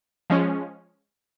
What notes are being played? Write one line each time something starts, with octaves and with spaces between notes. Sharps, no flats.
F3 G#3 C#4